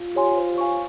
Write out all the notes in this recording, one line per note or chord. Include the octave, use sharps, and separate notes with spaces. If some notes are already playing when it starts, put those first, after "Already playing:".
Already playing: F4
G4 C#5 G#5 C6
C5
F5 G#5 C#6